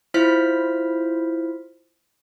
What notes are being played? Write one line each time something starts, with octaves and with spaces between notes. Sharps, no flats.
E4 F4 C5 F6 B6